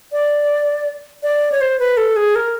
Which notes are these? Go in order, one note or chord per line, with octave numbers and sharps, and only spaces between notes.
D5
D5
C#5
C5
B4
A4
G#4
A#4